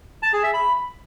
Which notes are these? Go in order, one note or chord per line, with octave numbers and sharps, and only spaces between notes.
A5
G#4
E5
B5